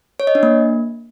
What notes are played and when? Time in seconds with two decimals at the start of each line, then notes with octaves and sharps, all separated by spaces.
0.20 C#5
0.27 D#5
0.35 D4
0.43 A#3